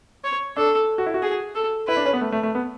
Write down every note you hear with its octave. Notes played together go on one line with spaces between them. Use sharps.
C#5
D4 A4
F#4
E4
F#4
G#4
A4
E4 B4
D4
C#4
B3
A3
A3
A3
B3